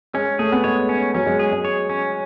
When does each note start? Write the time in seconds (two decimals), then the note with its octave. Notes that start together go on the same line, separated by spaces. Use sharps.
0.14 G#3 C#4
0.39 A3 G#4
0.52 B3
0.64 G#3 C#5
0.89 C#4
1.15 F#3 C#4
1.27 G#3
1.39 G#4
1.52 G#3
1.65 C#5
1.89 C#4